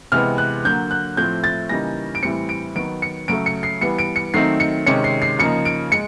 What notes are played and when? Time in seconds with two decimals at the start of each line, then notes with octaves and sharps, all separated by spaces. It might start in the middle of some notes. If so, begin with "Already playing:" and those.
0.12 C3 E3 G#3 B3 F6
0.38 F#6
0.64 D3 F#3 A#3 G6
0.91 F#6
1.17 A2 F3 A3 C4 G6
1.44 A6
1.69 C#3 E3 G3 A#3 D#4 A#6
2.15 D7
2.23 A2 E3 G3 C4 C#7
2.49 D7
2.75 D#3 F#3 B3 D7
3.02 C#7
3.28 C#3 F#3 A3 D7
3.46 C#7
3.63 C7
3.81 E3 G3 B3 C#7
3.99 D7
4.16 C#7
4.34 D#3 F#3 A3 C4 D#4 C7
4.60 C#7
4.86 C3 D#3 G#3 C#4 C#7
5.04 C7
5.22 C7
5.39 C#3 F3 A#3 D#4 C#7
5.65 D7
5.92 G#3 C#7